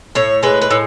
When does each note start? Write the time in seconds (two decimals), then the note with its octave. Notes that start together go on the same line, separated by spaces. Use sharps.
0.15 A2 C#5
0.43 G#3 B4
0.62 B4
0.71 A2